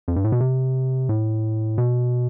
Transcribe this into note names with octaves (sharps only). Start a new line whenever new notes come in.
F2
G2
A2
B2
C3
A2
B2